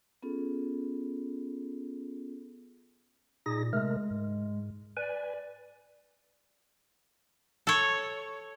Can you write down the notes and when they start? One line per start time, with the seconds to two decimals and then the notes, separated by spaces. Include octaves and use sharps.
0.23 B3 C#4 F4 G#4 A4
3.46 A#2 D#4 G#4 A#6
3.73 C3 G#3 A3 A#4
4.11 G#2
4.97 B4 D5 G#5
7.67 A4 C#5